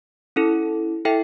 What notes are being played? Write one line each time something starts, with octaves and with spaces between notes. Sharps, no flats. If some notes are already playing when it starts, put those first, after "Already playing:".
C#4 E4 A4
E4 A4 E5 G5